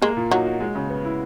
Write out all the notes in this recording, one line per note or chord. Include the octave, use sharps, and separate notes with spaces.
G#3 A#3
A#2
F#3 D#4
F#4
G#3
C#3
B3
E4